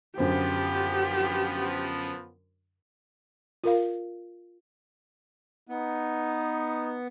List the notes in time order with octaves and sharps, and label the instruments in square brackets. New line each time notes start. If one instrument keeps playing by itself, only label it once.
[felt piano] F#2 D3 C5 [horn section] F3 B3 [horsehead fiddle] G4
[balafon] F4 A#4 F5
[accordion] B3 [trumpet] D#4